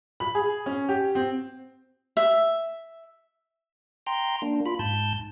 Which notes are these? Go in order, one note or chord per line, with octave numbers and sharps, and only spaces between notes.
B5
G#4
C#4
G4
C4
E5
G5 A#5 C6
A#3 D4
F4 B5
G#2 A5 G6